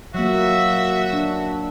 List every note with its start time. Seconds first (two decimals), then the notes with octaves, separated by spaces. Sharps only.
0.14 F#3 A#3 F#4 E5
1.13 D4